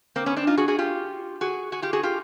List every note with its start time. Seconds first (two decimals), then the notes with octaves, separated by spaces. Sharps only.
0.16 A#3 C4
0.26 B3 C#4
0.37 C4 D4
0.47 D#4 F4
0.57 F#4 G#4
0.68 F#4 G#4
0.78 F4 G4
1.41 F#4 G#4
1.72 F#4 G#4
1.82 F4 G4
1.93 F#4 G#4
2.03 F4 G4